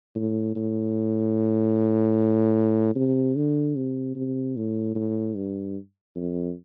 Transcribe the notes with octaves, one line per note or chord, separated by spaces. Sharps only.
A2
A2
C3
D3
C3
C3
A2
A2
G2
F2